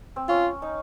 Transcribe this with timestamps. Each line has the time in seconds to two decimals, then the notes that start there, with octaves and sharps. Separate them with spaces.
0.16 C4
0.28 C#4 F4
0.62 D#4